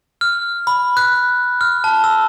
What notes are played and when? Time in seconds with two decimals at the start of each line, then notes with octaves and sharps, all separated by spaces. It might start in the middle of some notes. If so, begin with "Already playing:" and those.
0.21 F6
0.67 B5
0.97 F#6
1.61 F6
1.84 A5
2.04 E6